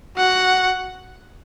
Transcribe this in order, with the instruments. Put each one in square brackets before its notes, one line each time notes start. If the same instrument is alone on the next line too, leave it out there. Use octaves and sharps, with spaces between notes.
[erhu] F#4 [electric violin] F#5